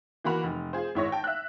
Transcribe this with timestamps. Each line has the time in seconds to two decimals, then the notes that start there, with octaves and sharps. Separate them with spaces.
0.24 E3 A#3 F#4 B5 F7
0.43 F1
0.73 F4 G#4 C5
0.95 G#1 G#2 E4 C#5 C#6 A#6
1.12 G5 A5
1.24 E5 F#6